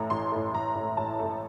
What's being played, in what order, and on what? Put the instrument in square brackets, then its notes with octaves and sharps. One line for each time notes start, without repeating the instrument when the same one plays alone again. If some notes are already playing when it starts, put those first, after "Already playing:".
Already playing: [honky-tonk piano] A1 A2 A3 A#5
A1 C6
A2 A3
A1 A#5
A2 A3
A1 A5
A2 A3